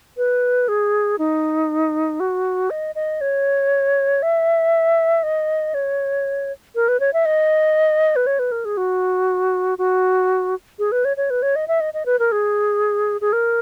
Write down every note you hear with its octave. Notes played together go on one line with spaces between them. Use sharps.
B4
G#4
D#4
F#4
D#5
D#5
C#5
E5
D#5
C#5
A#4
B4
C#5
E5
D#5
B4
C#5
B4
A#4
G#4
F#4
F#4
G#4
B4
C#5
C#5
B4
C#5
D#5
E5
D#5
D#5
B4
A#4
G#4
G#4
A#4